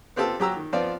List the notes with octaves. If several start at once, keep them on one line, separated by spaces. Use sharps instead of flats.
B3 C4 F4 G4 A4
F#3 G4 A#5 E6
D#3
F3 B3 C4 F4 D5